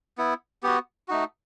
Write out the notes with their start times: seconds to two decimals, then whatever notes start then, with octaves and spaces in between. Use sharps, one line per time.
0.18 B3 E4
0.63 B3 F#4 G4
1.08 A3 D#4 F#4